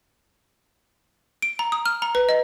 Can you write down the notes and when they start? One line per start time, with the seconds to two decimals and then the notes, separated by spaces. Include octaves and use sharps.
1.42 D7
1.59 A#5
1.72 D#6
1.86 F6
2.02 A#5
2.15 B4
2.29 D#5